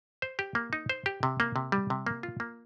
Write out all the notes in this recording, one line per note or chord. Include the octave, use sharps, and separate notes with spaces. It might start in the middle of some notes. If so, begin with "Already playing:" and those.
C5
G4
A#3
D#4
C5
G4
C3
A#3
C3
G3
C3
A#3
F4
A#3